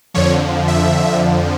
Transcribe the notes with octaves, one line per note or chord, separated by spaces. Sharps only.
F2 D3 F3 C#5
E5